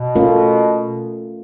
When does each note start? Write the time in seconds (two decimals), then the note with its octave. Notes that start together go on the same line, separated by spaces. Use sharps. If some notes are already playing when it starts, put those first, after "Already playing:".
Already playing: B2
0.15 A3 C#4 F4 A#4